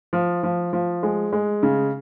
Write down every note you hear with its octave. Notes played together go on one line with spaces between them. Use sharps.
F3
F3
F3
G#3
G#3
C#3